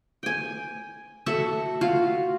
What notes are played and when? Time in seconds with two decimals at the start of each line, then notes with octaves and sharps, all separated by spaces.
0.23 G5 G#5
1.26 F#4 A4 E5 A5
1.81 F4 F#4 F5